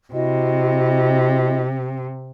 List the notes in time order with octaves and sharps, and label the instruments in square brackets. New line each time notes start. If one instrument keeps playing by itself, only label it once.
[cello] C3 [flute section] E4 F#4 D#5